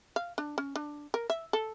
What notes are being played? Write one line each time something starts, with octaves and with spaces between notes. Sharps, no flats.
F5
D4
C#4
D4
A#4
E5
A4